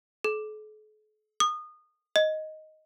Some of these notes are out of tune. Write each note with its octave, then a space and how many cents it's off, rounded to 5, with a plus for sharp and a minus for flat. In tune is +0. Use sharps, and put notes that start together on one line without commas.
A4 -45
D#6 -25
D#5 +5